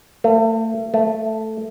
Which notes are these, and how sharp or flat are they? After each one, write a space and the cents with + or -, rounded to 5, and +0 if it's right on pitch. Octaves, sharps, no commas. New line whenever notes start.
A3 +35
A3 +0